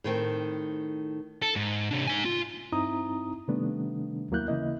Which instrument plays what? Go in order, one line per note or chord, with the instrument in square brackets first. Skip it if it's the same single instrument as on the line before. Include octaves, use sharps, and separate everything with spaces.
[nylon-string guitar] A2 D#3 C4
[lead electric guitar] A4
G#2
C3 D4
D#4 G#5
F4
[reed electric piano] G2 C4 D#4 E4 A#5 D#6
C3 D#3 G3 A3 B3 D4
D#2 F#3 A#3 E4 F#6 G6
C#3 E3 A#3 E4 D#5